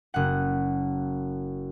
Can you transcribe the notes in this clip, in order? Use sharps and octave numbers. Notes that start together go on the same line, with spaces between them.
F#1 F#5